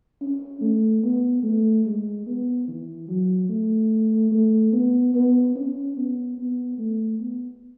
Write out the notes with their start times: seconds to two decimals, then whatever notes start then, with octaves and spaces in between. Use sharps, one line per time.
0.21 C#4
0.61 A3
1.03 B3
1.43 A3
1.85 G#3
2.26 B3
2.68 E3
3.08 F#3
3.49 A3
4.32 A3
4.73 B3
5.14 B3
5.55 C#4
5.96 B3
6.38 B3
6.78 A3
7.19 B3